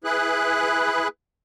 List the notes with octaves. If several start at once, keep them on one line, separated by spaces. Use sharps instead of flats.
E4 G#4 B4 F#6